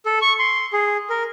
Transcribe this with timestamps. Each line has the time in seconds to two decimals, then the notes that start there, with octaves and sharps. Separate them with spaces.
0.06 A4
0.22 C#6
0.39 C6
0.73 G#4
1.10 A#4